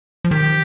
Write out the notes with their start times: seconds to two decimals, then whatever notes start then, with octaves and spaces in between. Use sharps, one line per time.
0.24 F3
0.31 D#3 G4